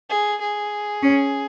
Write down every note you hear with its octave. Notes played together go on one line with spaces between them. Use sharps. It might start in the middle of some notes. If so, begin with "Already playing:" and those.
G#4
G#4
C#4